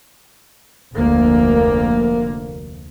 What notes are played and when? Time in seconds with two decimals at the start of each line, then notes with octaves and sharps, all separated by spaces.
0.93 F1 D2 A#3